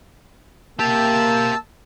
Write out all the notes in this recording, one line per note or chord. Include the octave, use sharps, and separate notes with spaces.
A#3 G4 E5 A5 E6